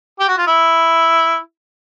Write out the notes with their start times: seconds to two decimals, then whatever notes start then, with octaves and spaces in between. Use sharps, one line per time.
0.19 G4
0.29 F#4
0.38 F4
0.47 E4